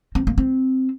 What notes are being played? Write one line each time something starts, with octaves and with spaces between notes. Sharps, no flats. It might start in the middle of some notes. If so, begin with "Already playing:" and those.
C4
A#3
C4